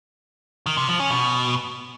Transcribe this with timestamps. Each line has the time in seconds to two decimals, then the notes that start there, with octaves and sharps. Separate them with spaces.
0.66 D#3
0.77 C3
0.88 F3
1.00 C#4
1.11 B2